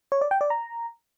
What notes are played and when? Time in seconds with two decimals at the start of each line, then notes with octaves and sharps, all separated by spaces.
0.12 C#5
0.21 D5
0.31 G5
0.41 D5
0.50 A#5